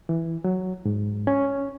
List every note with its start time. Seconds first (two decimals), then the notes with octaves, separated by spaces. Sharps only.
0.09 E3
0.44 F#3
0.85 G#2
1.27 C#4